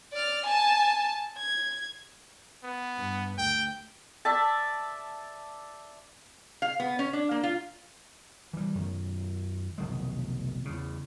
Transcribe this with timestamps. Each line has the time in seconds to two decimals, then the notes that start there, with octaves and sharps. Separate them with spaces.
0.13 D5 F6
0.46 G#5 A5
1.38 G#6
2.64 B3
2.97 G2
3.38 D2 G5
4.25 D5 E5 A5
6.62 F5
6.80 B3
6.99 C#4
7.13 D4
7.31 A#3
7.43 F4
8.53 E3 G3
8.75 F#2 D#3
9.78 F1 B1 D#3 G#3
10.65 E2 C#3